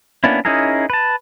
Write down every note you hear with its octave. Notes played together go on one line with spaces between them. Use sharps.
A#3 B3 C#4 D4 E4
C#4 D#4 E4 G#4 A#4
B4 A5